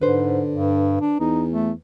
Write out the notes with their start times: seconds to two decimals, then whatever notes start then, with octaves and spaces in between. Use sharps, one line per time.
0.01 G#2 D3 B4 C5
0.50 G2
1.01 D4
1.20 E2 D#4
1.50 A3